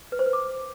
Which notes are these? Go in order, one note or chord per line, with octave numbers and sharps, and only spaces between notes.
B4
C5
B4
D6